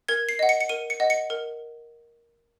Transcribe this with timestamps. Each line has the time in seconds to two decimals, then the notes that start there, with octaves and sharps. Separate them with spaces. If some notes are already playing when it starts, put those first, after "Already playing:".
0.08 A#4 G#6
0.29 C7
0.39 D#5 F#5
0.49 C#7
0.61 C#7
0.69 A#4 D#7
0.90 C#7
1.00 D#5 F#5
1.10 C#7
1.30 A#4